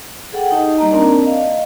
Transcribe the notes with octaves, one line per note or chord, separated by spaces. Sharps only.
G#4 A4 F#5 G5
D#4 G4 D#5 A5
G3 A#3 D#4 D#5 A#5
A#3 C4 D4 A#4 D5 A5
D#5 F5